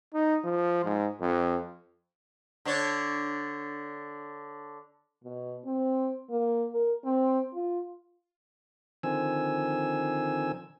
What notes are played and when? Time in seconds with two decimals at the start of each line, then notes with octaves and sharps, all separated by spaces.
0.14 D#4
0.44 F3
0.85 G#2
1.21 F2
2.65 D3 D4 C#5
5.24 B2
5.65 C4
6.29 A#3
6.73 A#4
7.04 C4
7.54 F4
9.03 D3 D#3 F3 C4 G#5 E6